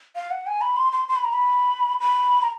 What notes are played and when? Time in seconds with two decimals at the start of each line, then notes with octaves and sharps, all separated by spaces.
0.16 F5
0.31 F#5
0.47 G#5
0.61 B5
0.77 C6
0.92 C6
1.08 C6
1.16 B5
1.24 A#5
1.33 B5
2.00 B5
2.42 A#5